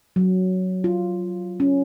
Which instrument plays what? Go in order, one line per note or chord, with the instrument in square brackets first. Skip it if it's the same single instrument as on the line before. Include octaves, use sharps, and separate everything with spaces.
[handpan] F#3
F4
C#4